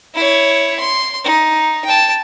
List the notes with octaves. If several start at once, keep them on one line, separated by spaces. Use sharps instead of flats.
E4 C#5
C6
D#4
G5 A5